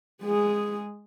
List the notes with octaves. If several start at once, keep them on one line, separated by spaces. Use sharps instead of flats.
G#3 G#4